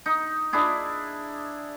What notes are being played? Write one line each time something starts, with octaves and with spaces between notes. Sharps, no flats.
D#4
D4 E4 G#4